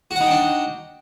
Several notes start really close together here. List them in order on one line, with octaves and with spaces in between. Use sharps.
F#4 F#5 D#4 G5 D4